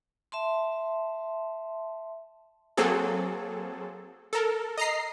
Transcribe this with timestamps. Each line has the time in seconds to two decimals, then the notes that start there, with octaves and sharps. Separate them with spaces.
0.32 E5 A5 C6
2.77 F#3 A#3 C4 G#4 A4
4.33 A4 A#4
4.78 D#5 A#5 C7